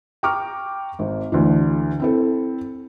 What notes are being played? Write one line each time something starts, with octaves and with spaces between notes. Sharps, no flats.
G5 A#5 C#6 D6 F6
G#1
D2 D3 E3
C4 E4 A4